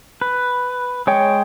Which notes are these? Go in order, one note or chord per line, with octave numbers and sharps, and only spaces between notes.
B4
G#3 C#5 G5